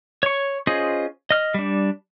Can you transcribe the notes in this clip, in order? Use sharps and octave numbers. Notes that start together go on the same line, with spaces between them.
C#5 C#6
C#4 F4 G#4 C5 D#5
D#5 F6
G3 D4